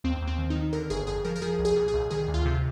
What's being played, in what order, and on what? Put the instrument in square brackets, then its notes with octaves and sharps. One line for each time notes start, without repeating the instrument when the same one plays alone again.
[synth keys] D#2 C4
D#2
C4
D#3
D#4
D#3
D3 A#4
G1 G#4
F2 G#4
F3 A#4
A#4
F3 G#4
C2
G#4
A#2
G#4
C2
D#3 G#4
D2
F4
C3